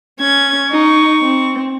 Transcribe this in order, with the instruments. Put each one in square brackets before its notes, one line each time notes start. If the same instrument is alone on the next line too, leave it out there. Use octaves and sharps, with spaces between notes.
[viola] C#4 [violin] G#6
[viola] D#4 [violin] C#6
[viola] C4